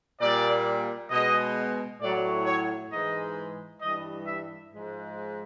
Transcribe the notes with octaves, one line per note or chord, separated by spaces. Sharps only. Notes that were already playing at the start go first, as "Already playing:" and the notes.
A#2 G3 D5
B2 G#3 D#5
A2 F#3 D5
C#5
G#2 E3 G#3 D#5
G2 E3 G3 D#5
E5
G#2 F3 G#3